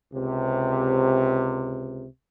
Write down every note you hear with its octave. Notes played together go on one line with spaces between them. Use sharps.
C#2 C3